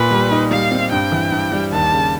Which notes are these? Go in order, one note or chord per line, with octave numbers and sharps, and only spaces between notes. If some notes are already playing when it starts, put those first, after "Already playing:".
Already playing: A#2 B4
G3
D#4
G3 F5
C4
G2 G5
E3
G2
G3
D#2 A5
C#3